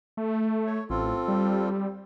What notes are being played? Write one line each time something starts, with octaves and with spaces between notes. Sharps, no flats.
A3
C#5
A1 C4 F4 A4
G3